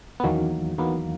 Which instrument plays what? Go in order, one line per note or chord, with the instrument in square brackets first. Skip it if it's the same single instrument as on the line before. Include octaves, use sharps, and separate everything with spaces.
[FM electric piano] B3
E2 D#3 F#3 A#3 C#4
E2 D#3 F#3 A#3 B3